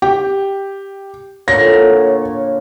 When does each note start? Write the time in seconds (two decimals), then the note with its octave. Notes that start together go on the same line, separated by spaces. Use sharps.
0.02 G4
1.48 A#2 D3 C#5 A#5 A#6